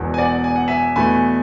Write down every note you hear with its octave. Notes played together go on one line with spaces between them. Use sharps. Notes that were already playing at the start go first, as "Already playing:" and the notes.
Already playing: E1 E2 B2
G#5
D5 F#5
G#5
F#5
E5 G#5
E2 B2 A3 G#5 B5